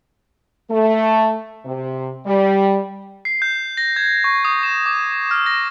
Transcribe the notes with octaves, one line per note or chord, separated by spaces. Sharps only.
A3
C3
G3
C7
G6
A#6
G#6
C#6
D#6
E7
D6
F6
A#6